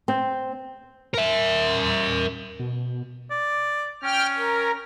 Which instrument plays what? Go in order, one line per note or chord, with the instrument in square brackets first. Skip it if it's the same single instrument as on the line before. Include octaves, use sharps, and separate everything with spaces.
[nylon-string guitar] C4
[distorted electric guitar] A#4 E5
[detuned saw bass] B2
[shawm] D5
[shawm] C#4 [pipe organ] G5 F6
[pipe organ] A#4